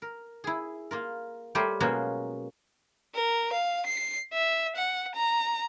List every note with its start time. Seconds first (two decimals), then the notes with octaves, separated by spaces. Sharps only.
0.02 A#4
0.44 E4 G#4
0.91 A#3 F4 A#4
1.55 G3 A3 G4 A#4 C5 C#5
1.80 B2 F#3 G#3 A#3 C#4 F#4
3.15 A#4
3.53 F5
3.86 C7
4.33 E5
4.76 F#5
5.15 A#5